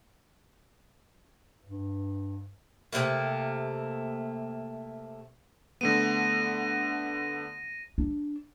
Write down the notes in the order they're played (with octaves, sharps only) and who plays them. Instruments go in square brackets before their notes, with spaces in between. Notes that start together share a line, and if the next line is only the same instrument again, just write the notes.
[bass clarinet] G2
[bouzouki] C3 G3 A3 A#3
[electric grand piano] D3 A3 B3 [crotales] A#6 D#7
[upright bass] D4